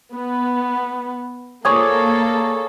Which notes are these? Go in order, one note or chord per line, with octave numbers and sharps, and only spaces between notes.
B3
A#3 G#4 A4 C#5 D5